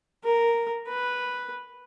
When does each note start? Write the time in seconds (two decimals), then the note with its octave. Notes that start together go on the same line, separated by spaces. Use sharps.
0.24 A#4
0.89 B4